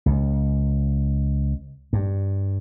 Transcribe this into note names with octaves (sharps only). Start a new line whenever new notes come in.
C#2
G2